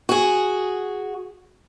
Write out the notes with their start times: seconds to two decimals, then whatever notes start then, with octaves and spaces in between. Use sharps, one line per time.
0.09 F#4 G#4